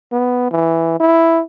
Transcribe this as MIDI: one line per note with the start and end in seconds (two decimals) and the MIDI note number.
0.13 0.51 59
0.51 0.96 52
1.00 1.42 64